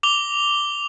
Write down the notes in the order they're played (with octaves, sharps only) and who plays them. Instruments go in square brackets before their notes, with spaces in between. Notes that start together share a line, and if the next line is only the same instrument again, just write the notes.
[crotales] D6 F7 G7